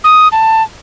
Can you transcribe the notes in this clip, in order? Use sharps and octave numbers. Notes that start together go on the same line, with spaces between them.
D#6
A5